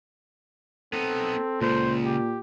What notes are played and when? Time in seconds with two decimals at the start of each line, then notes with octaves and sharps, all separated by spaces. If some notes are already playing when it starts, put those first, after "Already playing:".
0.93 B3 C4 D#4 A4
1.61 C#2 A#2 C#3 C5
2.05 G4